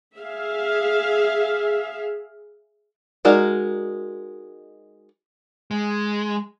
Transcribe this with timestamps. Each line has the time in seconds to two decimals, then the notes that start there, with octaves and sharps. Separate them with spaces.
0.17 G#4 E5 F5
3.25 G#3 D#4 F#4 A#4 D5
5.71 G#3